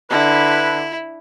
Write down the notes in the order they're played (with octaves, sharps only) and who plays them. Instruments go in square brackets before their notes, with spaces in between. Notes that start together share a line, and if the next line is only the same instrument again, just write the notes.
[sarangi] D3 [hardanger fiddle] E4 [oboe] B4